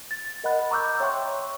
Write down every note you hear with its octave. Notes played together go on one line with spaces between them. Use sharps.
A6
A#4 D#5 F#5 B5 F#6
A#5 C#6 D6 E6 F#6 G6
C#5 E5 G5 C6 C#6 F#6